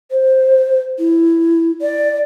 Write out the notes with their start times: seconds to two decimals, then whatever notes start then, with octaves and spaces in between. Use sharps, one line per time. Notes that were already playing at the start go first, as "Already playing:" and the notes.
0.11 C5
0.99 E4
1.82 D5